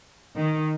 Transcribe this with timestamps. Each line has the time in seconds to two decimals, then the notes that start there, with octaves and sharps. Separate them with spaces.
0.37 D#3